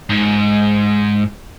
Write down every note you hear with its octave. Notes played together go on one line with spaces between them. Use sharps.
G#2